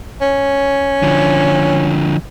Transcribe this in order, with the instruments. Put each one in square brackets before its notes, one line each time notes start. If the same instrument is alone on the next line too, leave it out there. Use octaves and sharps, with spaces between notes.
[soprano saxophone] C#4
[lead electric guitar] D3 F3